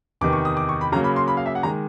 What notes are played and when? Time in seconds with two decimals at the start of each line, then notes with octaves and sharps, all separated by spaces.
0.21 E2 C3 D#3 D6
0.33 C#6
0.45 D#6
0.57 D6
0.69 C#6
0.81 B5
0.92 C#3 F#3 A#3 A#5
1.04 B5
1.16 C6
1.28 B5
1.37 F5
1.46 E5
1.55 F#5
1.63 D#3 G#3 A#5